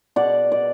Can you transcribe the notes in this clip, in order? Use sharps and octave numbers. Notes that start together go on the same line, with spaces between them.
B2 D5 F#5
D5